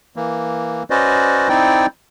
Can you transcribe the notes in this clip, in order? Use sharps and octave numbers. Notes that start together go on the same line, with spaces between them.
E3 A#3
C#4 F#4 B4 C5 D5 D#5
C4 D#4 E4 D5 G5